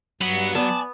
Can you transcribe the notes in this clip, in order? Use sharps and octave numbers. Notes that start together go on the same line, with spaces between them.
G2 F#3 F#5 B5
B3 D5 G#5 A5